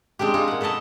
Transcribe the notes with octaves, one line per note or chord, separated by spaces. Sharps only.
G#3 C4 D4 G4
D#4 F4 G#4
A#2 F#5
A4 B4 C#5 D#5 A5